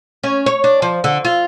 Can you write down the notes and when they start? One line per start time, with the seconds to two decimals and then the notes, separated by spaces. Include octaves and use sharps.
0.24 C#4
0.46 C#5
0.64 D4
0.82 F3
1.04 D3
1.25 F4